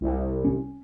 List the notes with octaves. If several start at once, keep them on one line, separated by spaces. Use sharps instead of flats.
C2
C#4